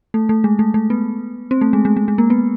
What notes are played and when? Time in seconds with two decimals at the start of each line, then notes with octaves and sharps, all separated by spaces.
0.14 A3
0.29 A3
0.44 G#3
0.59 A3
0.74 A3
0.90 B3
1.51 C4
1.61 A3
1.73 G#3
1.85 G#3
1.97 G#3
2.08 G#3
2.18 A#3
2.30 B3